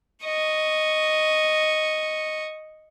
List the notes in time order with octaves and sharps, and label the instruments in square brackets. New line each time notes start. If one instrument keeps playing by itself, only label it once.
[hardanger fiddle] D#5 C#6